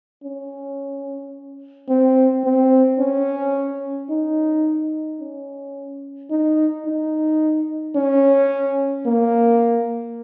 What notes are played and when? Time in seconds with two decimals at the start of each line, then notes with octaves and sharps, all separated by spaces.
0.24 C#4
1.89 C4
2.45 C4
2.99 C#4
4.10 D#4
5.21 C#4
6.31 D#4
6.86 D#4
7.96 C#4
9.06 A#3